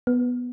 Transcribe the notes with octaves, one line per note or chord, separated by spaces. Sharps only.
B3